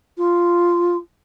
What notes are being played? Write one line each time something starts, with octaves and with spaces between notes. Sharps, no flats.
F4